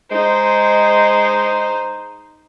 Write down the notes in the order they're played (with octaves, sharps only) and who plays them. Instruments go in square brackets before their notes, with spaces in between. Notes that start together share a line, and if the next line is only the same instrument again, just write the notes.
[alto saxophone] G#3 [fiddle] D#4 C5